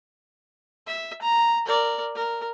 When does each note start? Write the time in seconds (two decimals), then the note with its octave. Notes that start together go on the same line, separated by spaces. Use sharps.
0.87 E5
1.22 A#5
1.66 A#4 D5
2.15 A#4